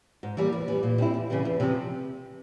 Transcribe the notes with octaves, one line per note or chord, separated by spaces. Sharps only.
G#2
E3 G3 A#3
E2
E3 G3
A#2
G3 C4 E4
E2
C#3 E3 G3
E2
C3 F3